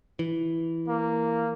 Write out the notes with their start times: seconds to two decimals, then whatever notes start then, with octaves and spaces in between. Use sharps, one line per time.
0.19 E3
0.88 A#3